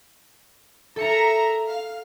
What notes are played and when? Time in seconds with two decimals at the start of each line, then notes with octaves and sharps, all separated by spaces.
0.96 A4 A#4 E5 A#5 C#7
1.68 F5